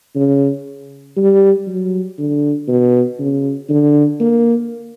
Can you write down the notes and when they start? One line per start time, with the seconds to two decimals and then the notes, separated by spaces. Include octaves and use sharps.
0.15 C#3
1.17 G3
1.67 F#3
2.18 D3
2.68 B2
3.19 C#3
3.69 D3
4.20 A#3